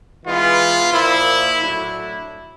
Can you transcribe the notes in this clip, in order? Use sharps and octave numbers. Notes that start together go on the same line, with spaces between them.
E3 G#3 B3 F4
A#2 F3 A#3 E4
A2 F#3 A3 D4 E4